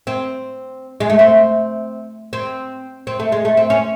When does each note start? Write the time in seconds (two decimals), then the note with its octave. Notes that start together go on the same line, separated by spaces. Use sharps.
0.07 C4
1.00 G#3
1.10 A3
1.19 C4
2.33 C4
3.07 C4
3.20 A3
3.32 G#3
3.45 A3
3.57 C4
3.70 C#4